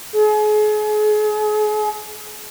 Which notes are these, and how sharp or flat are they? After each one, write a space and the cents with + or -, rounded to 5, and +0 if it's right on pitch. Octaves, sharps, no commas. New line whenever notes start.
G#4 +35